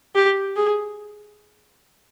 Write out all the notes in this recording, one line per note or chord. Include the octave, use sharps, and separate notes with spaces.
G4
G#4